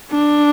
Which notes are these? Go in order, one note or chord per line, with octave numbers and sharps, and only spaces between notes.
D4